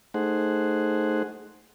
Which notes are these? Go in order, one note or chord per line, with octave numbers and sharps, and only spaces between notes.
A3 D#4 G#4 C5 F#5